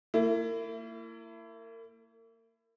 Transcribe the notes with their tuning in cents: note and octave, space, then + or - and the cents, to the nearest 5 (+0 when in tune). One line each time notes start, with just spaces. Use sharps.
A#3 -35 E4 +25